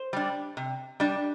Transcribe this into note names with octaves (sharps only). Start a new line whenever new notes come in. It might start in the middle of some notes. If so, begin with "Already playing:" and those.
Already playing: C5
G3 D4
C3
G3 D4